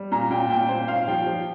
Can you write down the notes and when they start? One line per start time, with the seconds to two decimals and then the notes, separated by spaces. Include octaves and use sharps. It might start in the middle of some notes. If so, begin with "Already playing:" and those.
Already playing: G3
0.12 A#2 A#5
0.30 A#2 G5
0.50 A#2 G5
0.69 A#2 C5
0.88 A#2 F5
1.08 F3 G5
1.27 F3